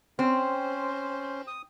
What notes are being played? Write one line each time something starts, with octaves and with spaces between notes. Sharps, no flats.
C4 C#4 C5
D#6